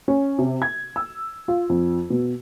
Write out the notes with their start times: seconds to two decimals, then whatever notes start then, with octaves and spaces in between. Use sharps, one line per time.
0.08 C#4
0.39 C3
0.62 G#6
0.96 E6
1.48 F4
1.69 F2
2.10 B2